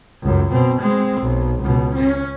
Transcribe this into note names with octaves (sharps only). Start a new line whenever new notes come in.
C#2 F#2
B2 C4
G#3 C4
B1
C#2 B2
C#4